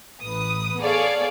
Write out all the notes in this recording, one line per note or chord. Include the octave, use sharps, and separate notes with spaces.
A1 B4 D#6
B3 G#4 A4 C#5 D5 F5